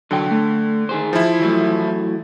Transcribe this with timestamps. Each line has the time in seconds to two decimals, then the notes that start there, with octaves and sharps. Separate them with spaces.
0.11 C2 D3 F#3 G5
0.31 A3
0.89 D#3 G#4 C5
1.13 F3 E4
1.40 E3 F#3 A3